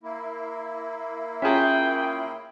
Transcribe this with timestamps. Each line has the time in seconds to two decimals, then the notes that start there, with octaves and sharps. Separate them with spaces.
0.03 A#3 E4
1.42 C#4 F4 G#4 E5 G5 A5 A#5